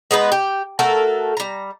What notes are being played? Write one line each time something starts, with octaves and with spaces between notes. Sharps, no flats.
G#3 B3 D#4 B4
G4
A3 F#4 A4 A#4
G3 A#5